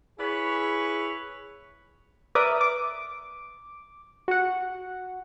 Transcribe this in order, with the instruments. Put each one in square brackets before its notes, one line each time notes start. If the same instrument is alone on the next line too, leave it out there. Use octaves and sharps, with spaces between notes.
[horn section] E4 G#4 B4 C#5
[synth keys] A#4 B4 D5 E5 D6 D#6
D6
F#4 F#5